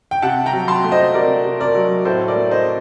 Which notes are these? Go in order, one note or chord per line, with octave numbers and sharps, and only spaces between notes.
G5
C3 F#5 A5
G5 A#5
F#3
A5 C6
A3
C5 D#5
C3 A#4 D5
C3
A#4 D5
F#3
A2 A4 C5
A#4 D5
A3
C5 D#5